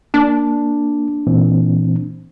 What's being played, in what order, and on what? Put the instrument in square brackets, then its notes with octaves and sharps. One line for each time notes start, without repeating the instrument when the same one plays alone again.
[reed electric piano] A#3 [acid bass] D4
[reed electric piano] A#2 E3 C4